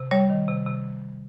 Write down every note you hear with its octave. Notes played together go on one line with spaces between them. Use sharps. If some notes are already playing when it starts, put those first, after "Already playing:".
Already playing: C3
G3 C#5
D#3
C3
C3